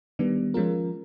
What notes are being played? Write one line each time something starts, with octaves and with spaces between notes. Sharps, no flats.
D#3 G3 B3 D4
F3 G#3 C#4 F4 A#4